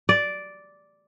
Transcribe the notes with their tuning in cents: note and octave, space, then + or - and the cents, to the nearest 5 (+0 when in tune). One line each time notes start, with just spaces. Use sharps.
D5 -5